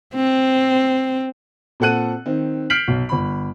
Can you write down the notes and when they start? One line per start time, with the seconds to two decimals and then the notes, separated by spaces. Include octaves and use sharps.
0.15 C4
1.80 A#2 C4 A4 F#5 F#6 D#7
2.26 D#3 C4
2.70 F6 G6 B6 C7 D7 F#7
2.88 B1
3.09 G1 B5